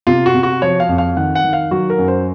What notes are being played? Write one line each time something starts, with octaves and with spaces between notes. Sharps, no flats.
C3 F4
F#4
C3
F#4
F3 C#5
F5
F2
F5
D#3 F#5
F#5
D#3
F5
F#3 F#4
A#4
F#2
C5